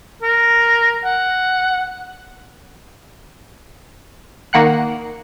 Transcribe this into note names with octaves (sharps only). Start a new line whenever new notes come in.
A#4
F#5
D#3 A#3 F#5 F#6